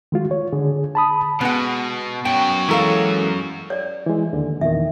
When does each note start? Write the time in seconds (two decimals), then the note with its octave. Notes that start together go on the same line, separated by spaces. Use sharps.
0.12 D#3 G#3 F4 F#4
0.31 C#5
0.53 D3 G#4
0.95 A5 B5 D#6
1.41 B2 G#3 B3 F#5
2.25 F#2 F#4 G5
2.69 E3 G#3 E4 A4 A#4 F5
3.70 C#5 D5
4.06 E3 G#3
4.33 D#2 D3
4.61 E2 A#2 D#3 E5